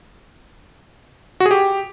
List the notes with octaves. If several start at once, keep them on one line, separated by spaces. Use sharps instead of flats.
F#4
G#4
G4